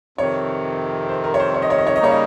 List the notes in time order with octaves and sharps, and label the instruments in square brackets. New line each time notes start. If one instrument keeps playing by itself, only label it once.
[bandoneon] F2 C3 D#3 [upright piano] C#5
[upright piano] C5
A#4
C#5
C5
C#5
D#5
C#5
D#5
C#5
D#5
[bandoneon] C#3 G3 A#3 D#4 [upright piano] C#5
[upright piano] D#5